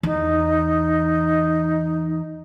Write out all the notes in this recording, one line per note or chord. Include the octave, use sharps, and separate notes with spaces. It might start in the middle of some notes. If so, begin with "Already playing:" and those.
E2 D#4